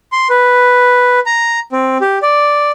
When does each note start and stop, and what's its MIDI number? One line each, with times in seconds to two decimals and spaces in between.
0.12 0.28 84
0.30 1.19 71
1.26 1.60 82
1.72 1.98 60
2.01 2.19 67
2.22 2.71 74